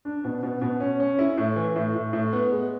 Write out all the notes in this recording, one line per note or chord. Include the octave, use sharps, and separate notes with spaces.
D4
B2
B2
B2
C#4
C#4
E4
A2
E3
A2
A2
A2
B3
G#3